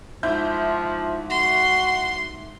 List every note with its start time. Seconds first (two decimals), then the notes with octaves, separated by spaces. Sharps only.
0.23 G#2 F3 E4 G6
1.30 F#4 C6